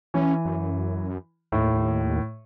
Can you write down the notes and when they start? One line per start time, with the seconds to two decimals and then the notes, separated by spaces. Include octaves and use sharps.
0.14 E3 C#4
0.45 F#2
1.52 D#2 A2
1.74 D#2